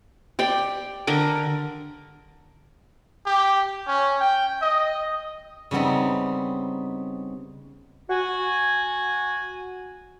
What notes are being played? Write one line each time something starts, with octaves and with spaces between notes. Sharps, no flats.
G4 D5 G5
D3 A#4 D6
G4
C#4
G5
D#5
C#3 G3 B3 C4 D#4
F#4 G#5